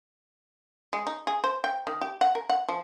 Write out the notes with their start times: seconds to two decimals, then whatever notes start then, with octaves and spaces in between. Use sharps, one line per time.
0.93 G#3
1.07 D#4
1.27 G#4
1.44 C5
1.64 G5
1.87 D#3
2.01 G4
2.21 F#5
2.35 A#4
2.49 F#5
2.69 F3